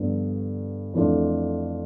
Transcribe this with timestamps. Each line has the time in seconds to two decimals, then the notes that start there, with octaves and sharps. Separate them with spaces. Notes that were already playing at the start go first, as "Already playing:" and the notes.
Already playing: G2 D3 F3 B3
0.94 F2 E3 A3 D4 F4